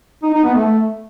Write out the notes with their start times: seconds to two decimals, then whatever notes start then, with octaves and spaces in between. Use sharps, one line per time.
0.23 D#4
0.34 D#4
0.44 B3
0.55 A3